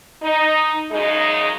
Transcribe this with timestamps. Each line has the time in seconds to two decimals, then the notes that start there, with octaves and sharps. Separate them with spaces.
0.23 D#4
0.91 F#2 C#3 G#3 D#4